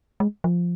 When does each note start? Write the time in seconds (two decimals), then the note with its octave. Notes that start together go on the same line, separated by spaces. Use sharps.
0.20 G#3
0.44 F3